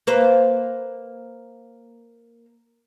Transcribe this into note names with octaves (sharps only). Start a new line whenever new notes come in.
A#3 B4 C5